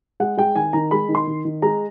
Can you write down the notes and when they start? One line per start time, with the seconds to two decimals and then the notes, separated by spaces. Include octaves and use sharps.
0.20 G#3 F#5
0.37 G#3 G5
0.56 D#3 G#5
0.73 D#3 A#5
0.91 G#3 B5
1.09 D#3
1.15 C6
1.27 D#3
1.45 D#3
1.62 G#3 A#5